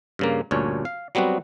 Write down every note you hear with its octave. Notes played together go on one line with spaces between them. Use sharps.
G2 C#3 A#3
D2 G2 A#2 C#4 D4 C#5
F5
F#3 G3 B3 C4 F#4